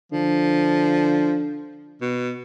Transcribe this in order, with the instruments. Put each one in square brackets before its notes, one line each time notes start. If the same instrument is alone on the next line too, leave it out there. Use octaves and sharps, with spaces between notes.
[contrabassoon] D3 [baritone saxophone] F3
[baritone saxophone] B2